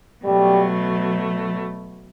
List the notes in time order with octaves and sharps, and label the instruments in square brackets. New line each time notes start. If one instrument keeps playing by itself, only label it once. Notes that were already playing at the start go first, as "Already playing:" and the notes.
[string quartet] B2 F#3 A3 [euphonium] G3